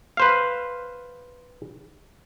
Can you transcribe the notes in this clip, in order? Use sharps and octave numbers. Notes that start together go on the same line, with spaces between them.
B4 C5 F5